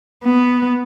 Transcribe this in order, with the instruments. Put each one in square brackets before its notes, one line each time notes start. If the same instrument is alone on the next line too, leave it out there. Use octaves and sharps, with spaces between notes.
[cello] B3